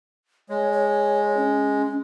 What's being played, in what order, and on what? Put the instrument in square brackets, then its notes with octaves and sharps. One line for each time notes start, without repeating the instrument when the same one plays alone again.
[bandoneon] G#3 [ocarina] C#5
[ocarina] C#5
C#4